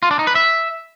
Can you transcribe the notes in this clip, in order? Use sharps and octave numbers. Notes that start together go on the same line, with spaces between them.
F4
D4
D#4
B4
E5